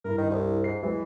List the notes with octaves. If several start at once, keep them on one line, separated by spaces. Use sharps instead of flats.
G2 E4 A#4
D#3
C2
G#2 C7
E3 F#3 G#3